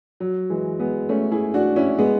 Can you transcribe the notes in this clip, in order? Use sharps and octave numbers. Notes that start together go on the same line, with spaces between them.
F#3
E3 G#3
G#3 B3
A3 C#4
E4 G#4
D4 F#4
C#4 E4
G#3 B3